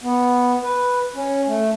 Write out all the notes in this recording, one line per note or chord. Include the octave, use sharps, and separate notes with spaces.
B3
B4
C#4
A3